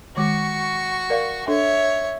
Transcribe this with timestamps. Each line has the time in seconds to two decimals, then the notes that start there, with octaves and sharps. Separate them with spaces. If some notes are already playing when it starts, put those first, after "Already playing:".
0.17 D#3 G#3 F#4 C#6 D6
1.10 A#4 D5 F5
1.48 D4 A4 C#5 E5